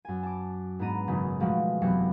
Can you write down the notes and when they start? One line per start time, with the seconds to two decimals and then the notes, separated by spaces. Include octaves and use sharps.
0.05 F#2 G#5
0.23 A5 D6
0.79 G#2 B3 D4 A#5 D#7
1.08 G#1 F#2 C#3
1.40 B2 F3 G#3 A3 F#4
1.82 E1 F#2 C3 F#3 B3 C#7